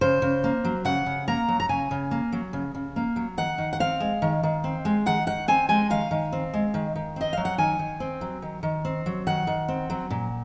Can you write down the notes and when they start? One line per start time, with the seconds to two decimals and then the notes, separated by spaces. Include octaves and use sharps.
0.01 C#3 C5
0.22 C#3
0.44 A#3
0.64 F#3
0.85 C#3 F#5
1.06 C#3
1.28 A#3 A#5
1.48 F#3
1.60 A#5
1.69 C#3 G#5
1.91 C#3
2.11 A#3
2.32 F#3
2.53 C#3
2.75 C#3
2.96 A#3
3.16 F#3
3.38 D#3 F#5
3.58 D#3
3.73 F#5
3.80 C4 F5
4.00 G#3
4.22 D#3
4.43 D#3
4.64 C4
4.85 G#3
5.06 D#3 F#5
5.27 D#3 F#5
5.48 C4 G#5
5.69 G#3 G#5
5.90 D#3 F5
6.11 D#3
6.33 C4
6.54 G#3
6.74 D#3
6.96 D#3
7.16 C4 D#5
7.33 F#3 F5
7.45 F#5
7.58 D#3 G#5
7.79 D#3
8.00 C4
8.21 F#3
8.42 D#3
8.63 D#3
8.85 C4
9.06 F#3
9.27 D#3 F#5
9.47 D#3
9.68 C4
9.90 F#3
10.10 A#2